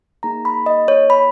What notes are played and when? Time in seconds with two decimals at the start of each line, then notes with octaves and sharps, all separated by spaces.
0.23 A#3 D#4 G#4 A#5
0.45 B5
0.66 D#5
0.88 C#5
1.10 B5